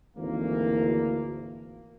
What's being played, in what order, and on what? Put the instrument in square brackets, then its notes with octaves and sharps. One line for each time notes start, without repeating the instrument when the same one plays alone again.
[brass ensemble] G#1 D2 E3 A#3